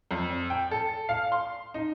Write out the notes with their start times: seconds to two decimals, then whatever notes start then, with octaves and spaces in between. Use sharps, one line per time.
0.11 F2
0.50 G5
0.71 A4
1.09 F5
1.32 C6
1.74 D#4